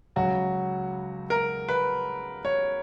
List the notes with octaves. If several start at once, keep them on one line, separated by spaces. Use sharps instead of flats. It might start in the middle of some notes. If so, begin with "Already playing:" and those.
C#2 C#3 F#3 F#4
A#4
B4
C#5